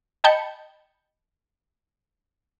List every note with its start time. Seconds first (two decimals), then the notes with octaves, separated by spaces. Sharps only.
0.24 D#5 G5 A5 B5 G6 C#7